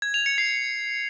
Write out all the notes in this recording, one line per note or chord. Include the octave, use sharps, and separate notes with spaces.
G#6
F7
C#7
C7